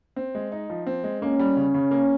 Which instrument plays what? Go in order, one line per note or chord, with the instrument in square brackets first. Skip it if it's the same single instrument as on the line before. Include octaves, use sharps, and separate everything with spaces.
[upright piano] C4
G#3
D#4
F3
C4
G#3
[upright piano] A#3 [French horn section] C#4
[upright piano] G3
C#3
C#3
A#3